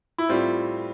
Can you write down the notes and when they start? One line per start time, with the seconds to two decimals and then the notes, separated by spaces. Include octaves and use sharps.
0.18 E4
0.29 A2 G3 C4 F4